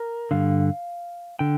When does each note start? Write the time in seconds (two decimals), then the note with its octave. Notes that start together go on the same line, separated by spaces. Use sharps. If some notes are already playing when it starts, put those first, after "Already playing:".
Already playing: A#4
0.31 G2 D3 F5
1.39 D3 G5